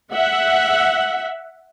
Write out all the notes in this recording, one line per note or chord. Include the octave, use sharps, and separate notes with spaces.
E5 F#5